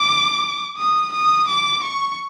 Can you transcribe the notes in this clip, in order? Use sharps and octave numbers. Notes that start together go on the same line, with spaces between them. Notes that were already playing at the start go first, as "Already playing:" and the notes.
Already playing: D6
D#6
D#6
D6
C#6